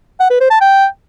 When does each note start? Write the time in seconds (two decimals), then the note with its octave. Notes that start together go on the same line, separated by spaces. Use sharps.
0.20 F#5
0.30 B4
0.40 C5
0.51 A5
0.61 G5